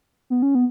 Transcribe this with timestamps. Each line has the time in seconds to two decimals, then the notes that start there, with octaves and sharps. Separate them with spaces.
0.30 B3
0.42 C#4
0.55 B3